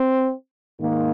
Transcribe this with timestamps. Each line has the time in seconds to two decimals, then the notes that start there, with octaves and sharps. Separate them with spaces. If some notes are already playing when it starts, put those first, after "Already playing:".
Already playing: C4
0.79 G#2 D#3 A#3